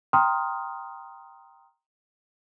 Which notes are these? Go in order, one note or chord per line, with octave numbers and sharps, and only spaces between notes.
G5 A#5 C6 D#6 F6